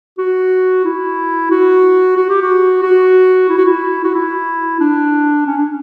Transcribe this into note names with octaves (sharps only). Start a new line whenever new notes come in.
F#4
E4
F#4
F#4
G4
F#4
F#4
E4
F#4
E4
F#4
E4
D4
C#4
D4